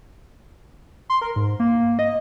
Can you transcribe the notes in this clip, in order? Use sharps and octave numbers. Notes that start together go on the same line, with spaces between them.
C6
A#4
G#2
A#3
D#5